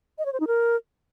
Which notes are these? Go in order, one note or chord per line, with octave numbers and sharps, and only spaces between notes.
D#5
C#5
C5
D#4
A#4